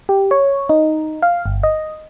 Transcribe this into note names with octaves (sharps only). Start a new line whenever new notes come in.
G4
C#5
D#4
F5
G1
D#5